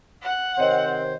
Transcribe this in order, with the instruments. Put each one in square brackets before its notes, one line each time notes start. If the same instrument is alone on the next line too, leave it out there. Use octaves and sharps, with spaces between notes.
[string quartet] F#5
[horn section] C3 D#3 C5 [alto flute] C4 [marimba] C#5 D#5